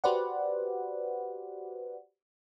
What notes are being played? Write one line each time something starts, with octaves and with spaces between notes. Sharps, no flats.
F#4 G4 B4 C5 D5 F#5